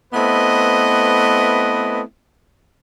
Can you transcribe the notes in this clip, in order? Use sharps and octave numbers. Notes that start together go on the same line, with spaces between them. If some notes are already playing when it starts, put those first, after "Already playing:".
A3 B3 C4 E4 B4 D#5